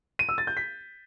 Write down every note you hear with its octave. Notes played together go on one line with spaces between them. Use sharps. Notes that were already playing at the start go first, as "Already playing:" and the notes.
D#7
E6
A6
G6
B6